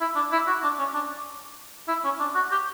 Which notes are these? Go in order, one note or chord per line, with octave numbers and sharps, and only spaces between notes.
E4
D4
E4
F#4
D4
C#4
D4
E4
C#4
D4
F#4
G4